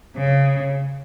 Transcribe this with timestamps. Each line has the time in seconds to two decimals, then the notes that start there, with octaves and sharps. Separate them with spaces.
0.16 C#3